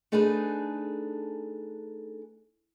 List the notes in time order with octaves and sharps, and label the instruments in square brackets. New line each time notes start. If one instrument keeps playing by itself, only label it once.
[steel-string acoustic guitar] A3 D4 D#4 G#4 A4 B4